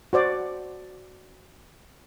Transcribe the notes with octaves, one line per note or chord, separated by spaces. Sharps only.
F#4 C5 D5